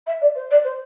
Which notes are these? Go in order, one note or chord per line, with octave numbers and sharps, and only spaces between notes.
E5
D5
C5
D5
C5